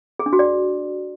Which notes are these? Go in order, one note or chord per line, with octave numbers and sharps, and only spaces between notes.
G#4
D4
F#4
D5